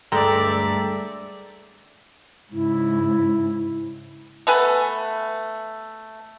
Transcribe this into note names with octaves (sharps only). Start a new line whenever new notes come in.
D2 G2 G#3 A4 D5 E5 G5 A#5
G#2 C#3 E4
A3 B3 B4 G#5